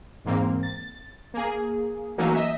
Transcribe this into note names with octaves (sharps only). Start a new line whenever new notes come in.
E2 G#2 A#3 C4
A6
A#3 G#4
E3 F#3 A3 A#3 C#4 D#4
D#5 E5